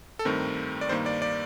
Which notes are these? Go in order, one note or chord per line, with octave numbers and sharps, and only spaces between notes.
A4
G2 D#3 A3 C4 A#4
D5
G2 D#3 A#3 C5
D5
D5